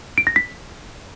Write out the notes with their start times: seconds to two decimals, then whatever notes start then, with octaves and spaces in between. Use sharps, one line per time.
0.18 D7
0.27 A#6
0.36 B6